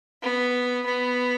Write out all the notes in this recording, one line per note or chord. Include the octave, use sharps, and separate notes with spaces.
B3
B3